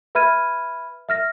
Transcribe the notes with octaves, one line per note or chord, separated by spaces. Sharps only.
B4 E5 B5 F6 G#6 D#7
E5 F6 A#6